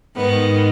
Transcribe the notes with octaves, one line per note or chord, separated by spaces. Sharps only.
G#2 D#3 B3